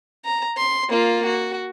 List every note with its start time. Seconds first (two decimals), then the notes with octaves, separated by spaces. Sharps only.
0.25 A#5
0.57 C6
0.89 A#3 F4
1.26 F#4